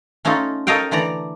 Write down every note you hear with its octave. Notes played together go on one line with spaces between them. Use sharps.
A3 C#4 D#4 F4 A4
A4 A#4 C#5 D#5 F5 G5
D3 E3 A3 D5 A#5